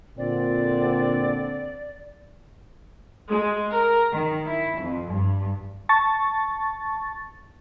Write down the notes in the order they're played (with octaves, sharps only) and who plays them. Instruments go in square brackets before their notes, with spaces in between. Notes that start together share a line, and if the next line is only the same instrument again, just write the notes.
[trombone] A#2 [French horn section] D3 C4 [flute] D5
[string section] G#3
A#4
D#3
E4
F2
G2
[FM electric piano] A5 C#6 A6